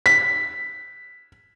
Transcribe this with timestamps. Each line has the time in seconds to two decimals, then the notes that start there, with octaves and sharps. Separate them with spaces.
0.06 B6